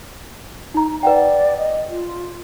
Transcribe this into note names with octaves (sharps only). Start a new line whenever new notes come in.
D#4 A#5
B4 D5 F#5 G5
D#5
F4